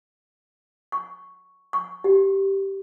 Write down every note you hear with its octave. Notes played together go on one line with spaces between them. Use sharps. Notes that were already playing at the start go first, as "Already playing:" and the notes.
C#6
C#6
G4